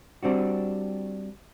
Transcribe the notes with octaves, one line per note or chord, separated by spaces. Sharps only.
G3 C4 D4 F#4